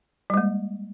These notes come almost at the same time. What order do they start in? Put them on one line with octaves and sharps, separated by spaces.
G3 G#3 A#3